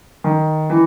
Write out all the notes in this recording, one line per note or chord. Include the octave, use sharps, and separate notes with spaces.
D#3
E3